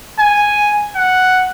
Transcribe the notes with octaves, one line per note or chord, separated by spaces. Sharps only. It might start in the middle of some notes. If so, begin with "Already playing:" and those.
G#5
F#5